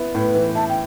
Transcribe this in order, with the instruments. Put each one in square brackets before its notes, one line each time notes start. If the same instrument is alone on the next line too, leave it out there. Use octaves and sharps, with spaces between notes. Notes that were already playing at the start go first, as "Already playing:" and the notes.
Already playing: [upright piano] B3 E4
[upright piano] A2 [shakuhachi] B4
[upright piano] E3
[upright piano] E4 [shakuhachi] A5
[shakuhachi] G5